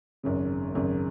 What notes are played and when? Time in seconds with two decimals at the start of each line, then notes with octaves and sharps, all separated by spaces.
0.23 G#1 F#2 C#3
0.75 G#1 F#2 C#3